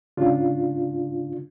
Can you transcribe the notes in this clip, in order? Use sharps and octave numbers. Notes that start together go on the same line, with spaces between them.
G#2 C#3 D4 F4